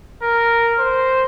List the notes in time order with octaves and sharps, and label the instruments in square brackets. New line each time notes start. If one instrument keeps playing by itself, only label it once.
[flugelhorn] A#4
C5